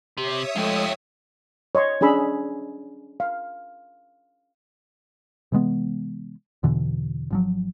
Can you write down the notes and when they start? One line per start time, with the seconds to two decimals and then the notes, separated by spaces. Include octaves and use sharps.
0.17 C3 G4 C#5 E5 D#6
0.56 F3 G#3 A3 F4 G4
1.75 C#5 D#5 C6 C#6
2.01 C#4 D4 G#4 B5 E6
3.20 F5
5.52 C3 E3 G#3 B3
6.63 E2 B2 D3 E3
7.31 G#1 F3 F#3